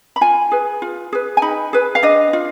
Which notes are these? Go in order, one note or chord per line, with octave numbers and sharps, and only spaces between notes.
B5
F4 G#5
G#4 B4
F4
G#4 B4
G#5
D#4 B5
G#4 B4
F5
D4 D#5
F4